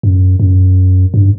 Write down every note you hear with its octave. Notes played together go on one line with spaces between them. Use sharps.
F#2
F#2
G2